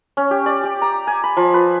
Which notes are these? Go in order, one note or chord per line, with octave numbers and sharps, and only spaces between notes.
C#4
G4
D5
G4
A#5
G#5
B5
F3
B4